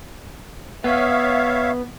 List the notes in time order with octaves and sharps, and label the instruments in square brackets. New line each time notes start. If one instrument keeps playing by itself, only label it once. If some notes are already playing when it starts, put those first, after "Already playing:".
[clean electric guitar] B3 [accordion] C#5 E5 F5